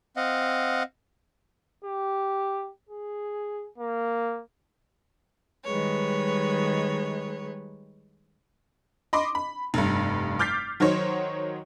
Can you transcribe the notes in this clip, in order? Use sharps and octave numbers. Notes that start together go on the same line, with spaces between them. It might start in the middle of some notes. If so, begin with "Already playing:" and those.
C4 D#5 F5 F#5
G4
G#4
A#3
D#3 G3 G#3 B4 C#5
D#5 B5 C6 D6
B5
F1 G2
D6 F6 G6 A6 B6 C7
D#3 F#3 D#4 C5 C#5